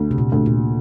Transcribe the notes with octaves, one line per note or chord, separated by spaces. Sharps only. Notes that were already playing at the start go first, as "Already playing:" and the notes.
Already playing: D2
C3
A#2
D2
A#2